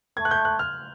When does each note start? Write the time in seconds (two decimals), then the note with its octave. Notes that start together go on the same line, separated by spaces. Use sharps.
0.17 A3 G#6
0.25 F#6
0.31 G6
0.45 F#6
0.59 F6